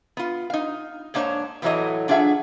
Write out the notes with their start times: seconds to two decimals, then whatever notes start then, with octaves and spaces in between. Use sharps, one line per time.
0.17 B3 F4
0.50 D#4 F5
1.14 G#2 A#3 D4 C5 C#5
1.62 E2 A2 E3 F#3 A3 D#5
2.08 F#3 D4 F4 G#4 E5 F#5